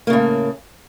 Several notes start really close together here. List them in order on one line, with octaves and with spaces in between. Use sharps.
A#3 C#3 A2